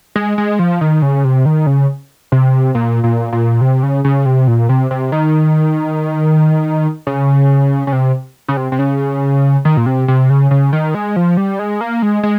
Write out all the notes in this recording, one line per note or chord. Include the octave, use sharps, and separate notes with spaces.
G#3
G#3
F3
D#3
C#3
C3
D#3
C#3
C3
A#2
A#2
A#2
C3
C#3
C#3
C3
A#2
C3
C3
D#3
C#3
C#3
C3
C#3
C3
C3
C#3
D#3
A#2
C3
C3
C#3
C#3
D#3
G#3
F3
G3
G#3
A#3
G#3
G#3